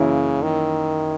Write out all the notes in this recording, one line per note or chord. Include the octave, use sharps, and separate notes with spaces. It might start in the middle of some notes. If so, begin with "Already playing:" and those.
Already playing: F#2 C#3 E3 A#3 E4
D#3